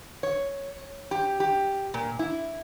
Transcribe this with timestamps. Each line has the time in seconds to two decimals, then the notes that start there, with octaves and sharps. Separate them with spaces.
0.23 C#5
1.11 G4
1.40 G4
1.94 A#2
2.19 E4